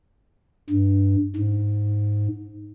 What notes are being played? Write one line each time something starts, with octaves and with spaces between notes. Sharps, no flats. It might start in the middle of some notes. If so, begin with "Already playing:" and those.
G2
G#2